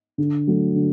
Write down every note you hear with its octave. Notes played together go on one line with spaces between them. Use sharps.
D3
F#3 A3
D3